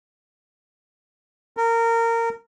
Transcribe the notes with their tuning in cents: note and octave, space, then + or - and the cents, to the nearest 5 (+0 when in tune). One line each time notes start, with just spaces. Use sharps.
A#4 -20